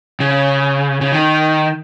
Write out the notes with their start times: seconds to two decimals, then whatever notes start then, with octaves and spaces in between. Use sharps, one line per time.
0.20 C#3
1.01 C#3
1.12 D#3